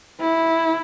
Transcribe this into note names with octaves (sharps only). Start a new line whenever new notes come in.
E4